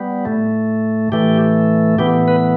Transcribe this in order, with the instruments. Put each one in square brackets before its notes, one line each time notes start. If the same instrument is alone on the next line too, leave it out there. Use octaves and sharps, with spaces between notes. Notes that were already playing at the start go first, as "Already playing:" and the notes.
Already playing: [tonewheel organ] G3 B3
A2 A3
A2 E3 A3 G4
A2 E3 B3 G4
B4